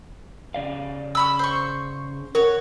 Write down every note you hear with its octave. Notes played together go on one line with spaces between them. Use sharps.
C#3 D5 F5
C#4 B5 E6
C5 C#6
F#4 A#4 C#5